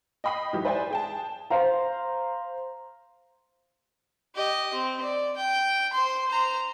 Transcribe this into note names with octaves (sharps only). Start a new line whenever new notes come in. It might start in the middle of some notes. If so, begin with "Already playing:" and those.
D#5 G5 B5 D#6 C7
G#2 E3 F#3 G4
B4 C5 D5 E5 G5 G#5
G#4 G5 A5
C5 F5 A#5
G4 D#5
C4
D5
G5
C5 C6
C5 A#5